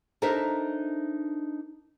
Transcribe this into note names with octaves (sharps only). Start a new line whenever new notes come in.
D4 D#4 A4 A#4 C5 E5